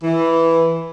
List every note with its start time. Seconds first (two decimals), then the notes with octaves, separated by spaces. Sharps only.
0.04 E3